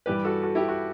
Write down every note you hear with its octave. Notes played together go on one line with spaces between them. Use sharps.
G2 E3 G3 G4 B4
F#4 A4
F#4 A4
E4 G4
F#4